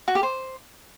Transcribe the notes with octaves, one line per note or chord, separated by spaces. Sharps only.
F#4
G4
C5